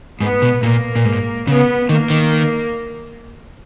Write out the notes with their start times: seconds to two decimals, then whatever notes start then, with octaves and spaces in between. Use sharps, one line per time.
0.20 G#2 B3
0.42 B2
0.63 A#2 A#3
0.95 A#2
1.05 G#2
1.47 C#3 B3
1.89 D#3 A#3
2.10 D#3